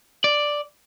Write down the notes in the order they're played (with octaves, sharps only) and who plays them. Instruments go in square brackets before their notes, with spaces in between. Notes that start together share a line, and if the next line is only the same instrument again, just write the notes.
[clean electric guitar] D5